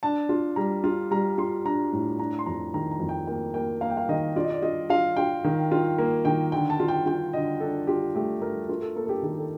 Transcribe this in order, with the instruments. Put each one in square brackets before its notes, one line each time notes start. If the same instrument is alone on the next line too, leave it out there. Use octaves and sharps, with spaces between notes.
[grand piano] D4 A5
F4
G3 A#5
F4
G3 A#5
F4 C6
D4 A#5
A2
D4 A#5
C6
F2 A#5
D#3 A#5
A#5
F2
G5
A#3 G5
A#3 G5
A#3 F5
G5
F5
D#3 D#5
F4 D5
D#5
D5
F4 D#5
F4 F5
F4 G5
D#3
F4
A#3
D#3 G5
D3 G5
A5
F4
G5
F4 G5
D3 D#5
D4 A4
F4 G4
A3 G4
A3 A#4
F4 A#4
A4
A#3 A4
A4
G4
D#3 G4
A4